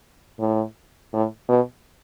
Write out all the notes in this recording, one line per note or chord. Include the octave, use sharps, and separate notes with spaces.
A2
A2
B2